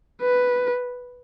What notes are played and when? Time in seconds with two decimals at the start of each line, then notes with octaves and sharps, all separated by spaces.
0.22 B4